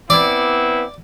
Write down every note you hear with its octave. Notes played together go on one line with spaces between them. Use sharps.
B3 C4 E4 D5